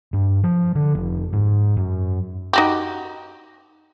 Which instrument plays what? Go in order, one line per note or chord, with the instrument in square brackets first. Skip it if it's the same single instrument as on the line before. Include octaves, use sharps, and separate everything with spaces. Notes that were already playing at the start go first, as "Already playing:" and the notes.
[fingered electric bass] G2
F3
D3
F1
G#2
F#2
[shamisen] D#4 F#4 G4